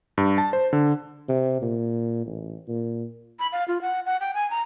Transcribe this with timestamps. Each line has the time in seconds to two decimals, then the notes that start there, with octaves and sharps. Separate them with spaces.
0.18 G2
0.38 A5
0.53 C5
0.73 D3
1.29 C3
1.62 A#2
2.26 A1
2.68 A#2
3.39 B5
3.52 F5
3.68 F4
3.82 F#5
4.06 F#5
4.20 G5
4.34 G#5
4.51 A#5